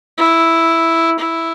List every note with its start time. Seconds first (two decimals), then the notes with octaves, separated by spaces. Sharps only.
0.18 E4
1.19 E4